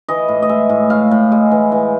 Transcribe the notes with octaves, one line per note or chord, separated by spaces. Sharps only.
E3 D#5
A2
D#5
G#3 E5
A2
A2 F5
A2
G#3
E3
E3